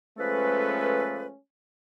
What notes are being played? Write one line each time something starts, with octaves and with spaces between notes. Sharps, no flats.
F3 G#3 A3 C#4 A4 B4